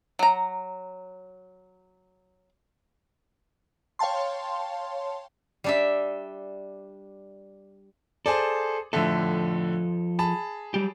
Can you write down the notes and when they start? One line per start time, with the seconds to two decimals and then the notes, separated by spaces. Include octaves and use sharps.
0.19 F#3 A#5
3.99 C#5 F5 G5 A5 C6
5.64 G3 D4 E5
8.26 G#4 A4 C5 D5
8.93 A2 D3 F3 A4 E5
10.19 G#4 A5 B5
10.74 F#3 G3 G4